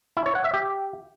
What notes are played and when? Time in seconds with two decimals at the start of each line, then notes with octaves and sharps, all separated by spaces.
0.17 E4
0.26 C#5
0.35 F#5
0.44 E5
0.54 G4